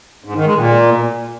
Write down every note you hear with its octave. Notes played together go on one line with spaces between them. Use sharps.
G#2
D#3
G#3
A#2